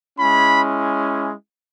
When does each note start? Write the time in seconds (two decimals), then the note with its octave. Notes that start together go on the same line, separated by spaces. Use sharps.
0.19 G#3 C#4 E4 B5